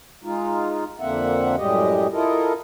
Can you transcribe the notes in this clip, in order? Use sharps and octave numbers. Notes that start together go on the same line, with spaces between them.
G#3 D#4 F4
F2 D3 A#3 C4 E5 F#5
F#2 A2 G3 G#3 G4 D#5
E4 F4 A4 A#4 D#5